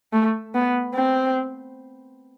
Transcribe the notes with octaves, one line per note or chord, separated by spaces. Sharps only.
A3
B3
C4